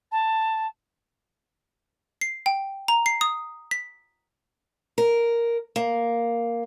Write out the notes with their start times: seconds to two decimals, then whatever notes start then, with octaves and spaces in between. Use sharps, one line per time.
0.12 A5
2.21 C7
2.46 G5
2.88 A#5
3.06 C7
3.21 D#6
3.71 B6
4.98 A#4
5.76 A#3